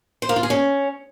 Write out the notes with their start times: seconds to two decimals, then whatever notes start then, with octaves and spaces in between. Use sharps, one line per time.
0.22 C5
0.29 A#3
0.36 F4
0.43 G#4
0.50 C#4